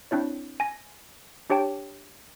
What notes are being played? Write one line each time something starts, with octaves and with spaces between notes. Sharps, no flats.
C4 D4 E4 C#5
G#5 A#6
D4 G4 C#5 G5 A5